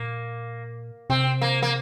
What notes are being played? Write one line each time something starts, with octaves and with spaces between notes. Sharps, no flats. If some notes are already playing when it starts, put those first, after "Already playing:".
Already playing: A#2 A#3
C3 C4
A#3
A#3